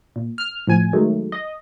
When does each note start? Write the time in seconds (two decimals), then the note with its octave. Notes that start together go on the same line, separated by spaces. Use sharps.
0.16 A#2
0.38 F6
0.67 A2 F3 G#5
0.93 D#3 F#3 G#3 A3
1.32 D#5